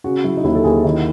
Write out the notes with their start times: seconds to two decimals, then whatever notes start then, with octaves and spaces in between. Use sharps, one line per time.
0.04 C#3 F#4
0.24 F#3 E4
0.37 D#4
0.44 D#2 E4
0.55 A4
0.64 D#2 G#4
0.84 D#3 E4